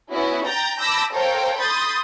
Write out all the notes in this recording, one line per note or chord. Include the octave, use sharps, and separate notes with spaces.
B3 C#4 E4 F#4
G5 A#5 G6 A6
A5 B5 D6 E6 G6 A#6
A4 A#4 C5 C#5 F5 G5
B5 C6 D#6 G6 A6